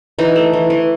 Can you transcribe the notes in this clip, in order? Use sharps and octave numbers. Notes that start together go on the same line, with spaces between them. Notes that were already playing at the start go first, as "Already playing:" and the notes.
E3 D#4
A3
E3
E3